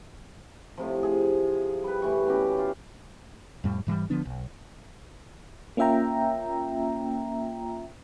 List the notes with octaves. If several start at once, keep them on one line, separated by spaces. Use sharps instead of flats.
A2 C3 F3
G#4
G3 B4
A2 E3 G3 C#6
B2 C#4 G4
F4 F5
F2 A2 G3
G#2 E3 F3 G3
D3 F3 B3 D4
B1
A#3 C#4 F4 E5 G5 A#5